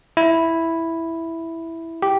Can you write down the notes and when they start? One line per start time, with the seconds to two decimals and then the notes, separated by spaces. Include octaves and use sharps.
0.17 E4
2.02 G4